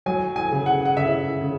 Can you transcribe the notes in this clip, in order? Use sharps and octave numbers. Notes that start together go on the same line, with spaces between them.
F#3 G#5
G#5
C#3
F#5
F#5
C#3 E5
C#3